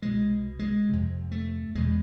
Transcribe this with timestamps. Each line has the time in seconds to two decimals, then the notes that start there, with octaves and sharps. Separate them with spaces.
0.02 C2 B2 G#3
0.59 G#3
0.89 F2 C3
1.32 A3
1.75 E2 B2 G#3